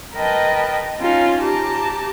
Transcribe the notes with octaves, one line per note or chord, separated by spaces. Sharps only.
A#4 B4 D#5 G5 A5
C#4 D#4 F4
G4 A5 A#5